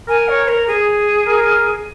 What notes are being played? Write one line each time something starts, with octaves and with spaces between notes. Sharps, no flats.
A#4 G#5
C#5
A#4
G#4
A#4